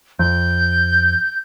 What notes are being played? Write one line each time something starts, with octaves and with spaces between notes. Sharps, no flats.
F2 G6